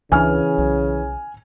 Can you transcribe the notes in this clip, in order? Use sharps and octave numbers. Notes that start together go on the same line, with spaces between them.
C#2 C#3 E3 A3 D4 G#5 F6
B1